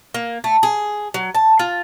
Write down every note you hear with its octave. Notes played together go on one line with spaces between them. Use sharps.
A#3
A3
G#4
F#3
A5
F4